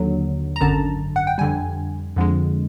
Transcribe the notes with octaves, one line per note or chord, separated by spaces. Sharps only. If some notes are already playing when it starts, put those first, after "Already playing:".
Already playing: D#2 D3 F#3
A#5
G#1 F#2 D3 A5
F#5
G5
F2 D3 G3 G#5
F2 D3 F3 G#3